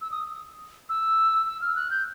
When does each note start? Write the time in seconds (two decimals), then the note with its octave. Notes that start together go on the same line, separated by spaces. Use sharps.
0.01 E6
0.11 D#6
0.89 E6
1.47 E6
1.61 F6
1.76 F#6
1.91 G6